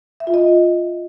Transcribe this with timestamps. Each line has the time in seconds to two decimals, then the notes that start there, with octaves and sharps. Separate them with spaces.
0.20 E5
0.27 F4
0.34 D#5